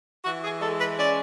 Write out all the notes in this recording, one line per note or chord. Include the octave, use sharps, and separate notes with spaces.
E3 F#4
G#4
G#3 A4
B4
C#4 D5